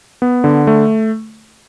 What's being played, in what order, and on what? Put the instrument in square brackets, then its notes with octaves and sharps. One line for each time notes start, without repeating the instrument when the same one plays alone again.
[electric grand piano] B3
D3
A3